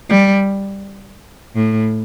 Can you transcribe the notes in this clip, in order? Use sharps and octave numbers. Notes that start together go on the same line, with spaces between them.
G3
A2